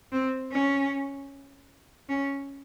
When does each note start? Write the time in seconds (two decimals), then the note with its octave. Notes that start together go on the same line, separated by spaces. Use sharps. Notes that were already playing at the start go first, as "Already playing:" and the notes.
0.12 C4
0.52 C#4
2.09 C#4